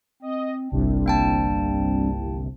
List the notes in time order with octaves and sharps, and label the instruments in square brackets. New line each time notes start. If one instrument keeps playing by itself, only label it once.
[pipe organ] C4 [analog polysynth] D#5
[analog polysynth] G1 C2 C3 [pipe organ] G3 C4 D4
[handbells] A#3 G5 A5